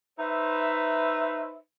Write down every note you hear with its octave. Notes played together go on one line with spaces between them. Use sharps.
D#4 B4 C5 E5